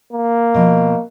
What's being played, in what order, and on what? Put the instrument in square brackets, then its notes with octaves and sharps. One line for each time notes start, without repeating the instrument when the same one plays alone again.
[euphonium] A#3
[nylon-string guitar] B2 F3